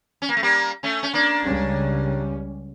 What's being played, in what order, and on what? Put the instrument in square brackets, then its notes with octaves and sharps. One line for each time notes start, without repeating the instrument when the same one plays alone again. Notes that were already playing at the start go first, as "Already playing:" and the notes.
[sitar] C#4
A#3
A3
G3 A#3
A3 C#4
C#4
A#3 D4
[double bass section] C#2 C#3 G3 C#4